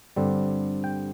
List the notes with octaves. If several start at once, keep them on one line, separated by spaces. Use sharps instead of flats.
G2 D3 G3 C4
G5